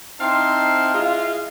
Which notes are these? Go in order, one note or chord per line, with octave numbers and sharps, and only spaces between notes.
C4 D#4 E4 F5 A5 C6
G#3 E4 F4 D#5 F5